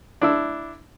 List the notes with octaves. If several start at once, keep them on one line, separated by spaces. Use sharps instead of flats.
D4 E4 E6